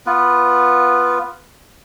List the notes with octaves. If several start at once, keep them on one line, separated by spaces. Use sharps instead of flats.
B3 F4 B4